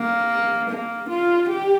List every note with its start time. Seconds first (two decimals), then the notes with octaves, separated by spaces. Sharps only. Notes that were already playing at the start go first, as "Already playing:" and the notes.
Already playing: A#3
0.70 A#3
1.10 F4
1.49 G4